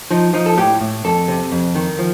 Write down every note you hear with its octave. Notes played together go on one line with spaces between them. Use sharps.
F3 D#4
F3 D#4
A4
A2 G4
A2
F2 A4
C3
F2
D#3
F3